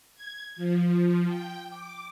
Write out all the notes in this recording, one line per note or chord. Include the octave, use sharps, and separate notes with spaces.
G#6
F3
G5
D6